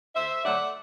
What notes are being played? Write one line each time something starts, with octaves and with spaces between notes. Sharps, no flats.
D2 C5 E5
D3 F#3 A3 D5 F#5